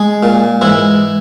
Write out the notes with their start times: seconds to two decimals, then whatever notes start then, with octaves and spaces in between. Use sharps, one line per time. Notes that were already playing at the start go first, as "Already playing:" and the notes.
Already playing: G#3 G#4
0.23 A#2
0.61 G#2 E3 E4